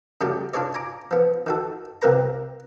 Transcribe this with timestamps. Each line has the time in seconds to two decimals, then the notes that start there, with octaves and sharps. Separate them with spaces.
0.21 C#3 G3 A3 F#4 G4
0.54 D4 F4 G#4 C#5 D5
0.74 G#5 A#5 D6
1.11 F3 B3
1.47 D#3 F#4 A4
2.02 C2 C3 A#4 B4 A#5